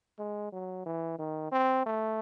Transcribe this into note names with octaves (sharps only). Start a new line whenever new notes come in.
G#3
F#3
E3
D#3
C4
A3